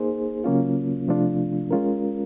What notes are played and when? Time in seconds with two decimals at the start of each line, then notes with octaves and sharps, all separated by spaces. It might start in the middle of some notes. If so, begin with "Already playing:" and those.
Already playing: A#3 D#4 G#4 C5
0.44 C#3 F#3 A#3 C#4 F4
1.08 C3 F3 A3 D4 F4
1.71 G#3 C#4 F4 A#4